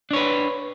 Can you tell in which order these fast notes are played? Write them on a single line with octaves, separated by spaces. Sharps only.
D4 C#5 B4